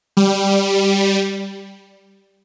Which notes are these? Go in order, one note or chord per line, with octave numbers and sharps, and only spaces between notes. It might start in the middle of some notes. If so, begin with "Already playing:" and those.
G3